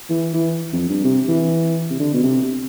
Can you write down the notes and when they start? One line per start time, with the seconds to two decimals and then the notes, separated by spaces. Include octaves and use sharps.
0.10 E3
0.33 E3
0.73 F2
0.89 G2
1.04 C3
1.28 E3
1.90 C3
1.99 D3
2.14 B2
2.23 C3